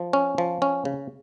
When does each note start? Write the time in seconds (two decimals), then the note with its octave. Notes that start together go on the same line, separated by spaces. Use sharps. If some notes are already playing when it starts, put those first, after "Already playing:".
Already playing: F3
0.13 C#4
0.38 F3
0.62 C#4
0.85 C#3